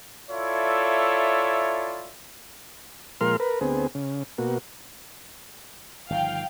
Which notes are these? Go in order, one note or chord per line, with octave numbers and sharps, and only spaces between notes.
E4 F4 A4 C#5 D5 E5
A#2 F3 G#3 A#4 C6 F6
A#4 B4
D2 B3 C4 G#4
C#3
B2 A#3 F#4
G1 D#3 F3 F5 G5